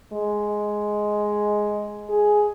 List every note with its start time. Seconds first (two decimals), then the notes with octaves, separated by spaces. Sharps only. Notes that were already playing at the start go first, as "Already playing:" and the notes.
0.13 G#3
2.10 G#4